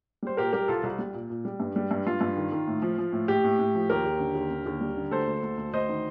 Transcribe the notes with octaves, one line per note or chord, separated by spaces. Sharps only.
G3 C5
A#2 G4 A#4
G3 G4 A#4
C2 F4 A4
C2
G3
A#2
A#2
G3
G2
G3
G2
G2 F4
G2
D#3
D#3
A2
F3
F3
A2
A2 G4
A2
A2
F3
D#2 G4 A#4
D#2
D3
D#2
D3
D#2
G3
D3
D2 A4 C5
D2
D2
D2
D2 C5 D#5
D#3